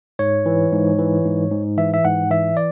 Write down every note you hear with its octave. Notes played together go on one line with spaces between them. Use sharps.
G#2 C#5
E3
G#2
E3
G#2
G#2
E3 E5
E5
G#2 F#5
E3 E5
D5